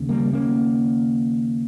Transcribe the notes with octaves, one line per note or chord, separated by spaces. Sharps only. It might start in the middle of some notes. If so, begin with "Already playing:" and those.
Already playing: D#2 C#3
G3 A#3
A#3 C#4